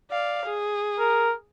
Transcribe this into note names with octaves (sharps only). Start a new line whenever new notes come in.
D5 F5
G#4
A#4